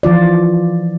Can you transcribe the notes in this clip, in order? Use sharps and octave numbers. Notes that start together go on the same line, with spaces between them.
E3 F3 F4 D5